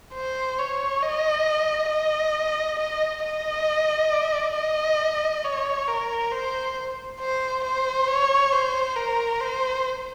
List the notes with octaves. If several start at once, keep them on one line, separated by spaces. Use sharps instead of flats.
C5
C#5
D#5
D#5
D#5
D#5
D#5
C#5
A#4
C5
C5
C5
C#5
C5
A#4
C5